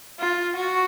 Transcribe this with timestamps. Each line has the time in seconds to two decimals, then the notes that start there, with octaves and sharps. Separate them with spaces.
0.20 F4
0.56 F#4